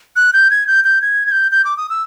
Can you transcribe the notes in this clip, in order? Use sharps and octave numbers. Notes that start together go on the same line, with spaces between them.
F#6
G6
G#6
G6
G6
G#6
G#6
G6
G6
D6
D#6
E6